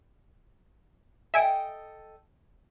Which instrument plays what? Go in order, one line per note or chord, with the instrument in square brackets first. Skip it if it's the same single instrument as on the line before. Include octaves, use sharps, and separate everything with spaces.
[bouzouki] A4 D#5 G5 [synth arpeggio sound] E5 G#5 D7